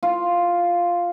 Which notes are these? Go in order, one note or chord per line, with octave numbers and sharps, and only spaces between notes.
F4